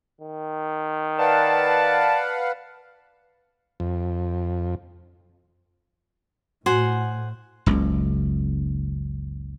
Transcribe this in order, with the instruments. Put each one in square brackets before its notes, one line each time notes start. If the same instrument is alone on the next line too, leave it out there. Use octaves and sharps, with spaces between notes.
[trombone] D#3
[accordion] B4 F5 F#5 [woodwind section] D5 A5
[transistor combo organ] F2
[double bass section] A2 [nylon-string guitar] F#4 [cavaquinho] C5 F#5 G#5
[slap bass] F#1 C#2